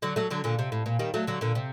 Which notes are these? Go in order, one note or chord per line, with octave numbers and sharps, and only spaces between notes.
D3 F#3
F#3 A3
D3 F#3
A#2 D3
C3
A2
A#2
D#3 G3
F#3 A3
D3 F#3
A#2 D3
C3